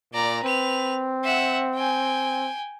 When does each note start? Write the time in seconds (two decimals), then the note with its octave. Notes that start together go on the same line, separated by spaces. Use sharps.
0.14 A#2 D5 A#5
0.43 C4 B4 F7
1.24 E5 F#5
1.75 G5 G#5